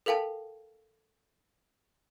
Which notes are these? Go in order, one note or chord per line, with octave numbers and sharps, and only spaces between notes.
A4 A#4 F5 G5 A5